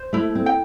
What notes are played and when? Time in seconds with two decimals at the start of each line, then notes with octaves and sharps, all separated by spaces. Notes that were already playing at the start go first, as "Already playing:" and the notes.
Already playing: C5
0.13 A3 E4
0.35 C4
0.46 G5